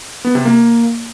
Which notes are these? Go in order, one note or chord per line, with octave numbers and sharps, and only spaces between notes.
B3
C3
A#3